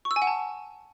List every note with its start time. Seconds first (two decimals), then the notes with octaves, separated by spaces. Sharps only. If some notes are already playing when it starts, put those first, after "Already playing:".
0.05 C#6
0.11 E6
0.16 G#5
0.22 F#5
0.27 A5